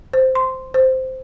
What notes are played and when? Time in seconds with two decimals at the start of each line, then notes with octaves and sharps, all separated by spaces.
0.13 C5
0.35 C6
0.74 C5